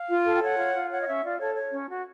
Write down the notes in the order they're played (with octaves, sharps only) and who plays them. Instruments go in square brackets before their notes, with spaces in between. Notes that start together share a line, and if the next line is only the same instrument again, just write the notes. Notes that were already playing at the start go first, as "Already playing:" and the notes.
Already playing: [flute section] F5
F4
A4
G5
C#5 F#5
F4
F4
C#5 F#5
D#5
C#4 E5
F4 D5
A4 C#5
C#5
C#4
F#4